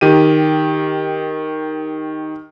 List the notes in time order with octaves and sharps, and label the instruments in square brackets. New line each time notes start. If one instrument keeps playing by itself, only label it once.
[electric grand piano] D#3 G4 D#7